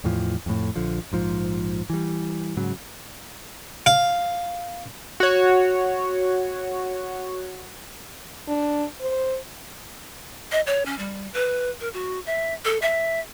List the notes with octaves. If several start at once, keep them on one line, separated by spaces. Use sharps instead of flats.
E2 A2 E3 F3
F2 A2
A#1 D3 F3
A#1 G#2 F3
E3 G3
G#2 C#3 F#3
F5
F#4 C#5
D4
C5
D#5
C#5
C#4
G3
B4
A#4
F#4
E5
A4
E5